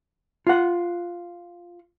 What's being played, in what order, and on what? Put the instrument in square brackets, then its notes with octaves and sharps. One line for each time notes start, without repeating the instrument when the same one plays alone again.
[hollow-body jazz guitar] F4 F#5